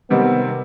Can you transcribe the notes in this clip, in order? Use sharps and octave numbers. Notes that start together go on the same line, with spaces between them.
C3 D#3 G3 B3 C4